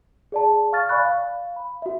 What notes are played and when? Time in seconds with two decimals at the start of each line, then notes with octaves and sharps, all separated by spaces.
0.32 G#4 D5 A5
0.72 F5 C#6 F6 A6
0.89 D5 F5 G#5 B5 C#6 F#6
1.05 F5
1.56 B5
1.82 F#4 E5